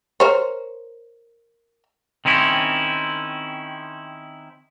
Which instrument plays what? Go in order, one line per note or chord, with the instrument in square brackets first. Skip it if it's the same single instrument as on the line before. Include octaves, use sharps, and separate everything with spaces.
[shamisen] A#4 C5 C#5
[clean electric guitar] D#3 C4 C#4 E4